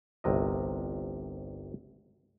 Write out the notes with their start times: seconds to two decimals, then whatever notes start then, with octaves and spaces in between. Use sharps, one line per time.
0.24 G1 C2 C3 A#4 D#5